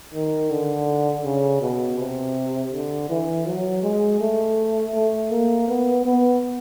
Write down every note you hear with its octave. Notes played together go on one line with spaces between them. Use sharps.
D#3
D3
C#3
B2
C3
D3
E3
F#3
G#3
A3
A3
A#3
B3
B3